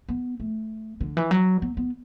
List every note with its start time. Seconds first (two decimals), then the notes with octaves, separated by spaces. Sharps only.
0.09 B3
0.40 A3
1.01 D3
1.17 E3
1.31 F#3
1.62 B3
1.77 B3